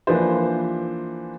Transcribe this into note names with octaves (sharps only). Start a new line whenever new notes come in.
E3 F3 A#3 D4 B4 C5